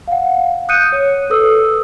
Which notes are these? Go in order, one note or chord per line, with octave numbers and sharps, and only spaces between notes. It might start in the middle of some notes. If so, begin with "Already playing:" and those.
F5 F#5
D#6 F#6 G6 C#7 D#7
C#5
A4 B4 D#6 E6